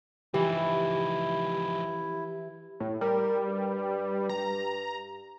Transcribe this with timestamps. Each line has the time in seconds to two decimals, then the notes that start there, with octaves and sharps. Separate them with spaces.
0.34 E3 F3 D#4 E4 G4
2.80 A2
3.01 G3 A#4
3.47 G2
4.29 A#5